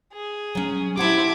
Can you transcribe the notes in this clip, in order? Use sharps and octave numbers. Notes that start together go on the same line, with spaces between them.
G#4
F#3 C#4
C4 E4 G4 F#5 A5 D6 G#6